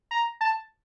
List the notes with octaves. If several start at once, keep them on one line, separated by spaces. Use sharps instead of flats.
A#5
A5